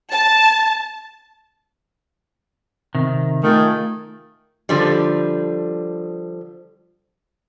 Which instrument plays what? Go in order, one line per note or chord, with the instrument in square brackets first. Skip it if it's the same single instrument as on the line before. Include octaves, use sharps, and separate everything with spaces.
[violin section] A5
[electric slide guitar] C3 D#3
[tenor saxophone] D#3 [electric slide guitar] A3 F4 G#4
[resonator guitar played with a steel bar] D3 F3 G3